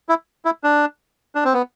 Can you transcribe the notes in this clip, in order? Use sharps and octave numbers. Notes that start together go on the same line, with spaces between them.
E4
E4
D4
D4
C4
B3